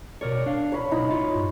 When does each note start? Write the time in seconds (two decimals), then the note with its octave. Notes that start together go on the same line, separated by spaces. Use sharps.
0.21 B2 A#4 C#5 D5
0.46 D4 F5
0.72 C#5 B5
0.91 B1 D#4 E4 B5
1.11 F4 C#5
1.35 G2